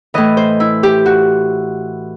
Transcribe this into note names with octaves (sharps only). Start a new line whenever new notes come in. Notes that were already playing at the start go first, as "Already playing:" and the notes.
A2 E3 D#5
C5
E4
G4
F#4